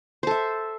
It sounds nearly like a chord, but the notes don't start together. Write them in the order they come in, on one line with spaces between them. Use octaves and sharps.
C5 A4 E5